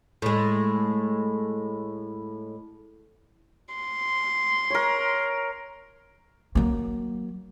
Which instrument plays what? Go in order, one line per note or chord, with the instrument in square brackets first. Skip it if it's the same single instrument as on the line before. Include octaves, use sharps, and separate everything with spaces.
[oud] A2 G#3
[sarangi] C6
[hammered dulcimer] A#4 C#5
[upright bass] F#3 A#3